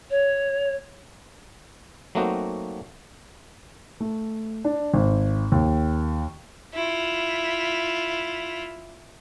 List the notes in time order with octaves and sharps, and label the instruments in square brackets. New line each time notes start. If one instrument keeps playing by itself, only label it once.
[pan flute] C#5
[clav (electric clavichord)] F#3 A3 A#3 C4 D#4 F#4
[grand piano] A3
D4
G#1
D#2
[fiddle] E4 F4